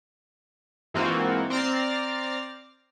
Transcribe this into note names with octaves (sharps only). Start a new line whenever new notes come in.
G#2 E3 A#3 C4 F4 F#4
C4 D5 A#5 F6 A6 C7